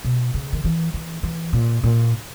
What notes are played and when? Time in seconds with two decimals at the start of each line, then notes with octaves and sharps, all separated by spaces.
0.04 B2
0.34 C#3
0.53 D#3
0.65 E3
0.94 E3
1.23 E3
1.53 A#2
1.84 A#2